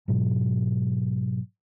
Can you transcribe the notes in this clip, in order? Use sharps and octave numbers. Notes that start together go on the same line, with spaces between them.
G#2 B2 F#3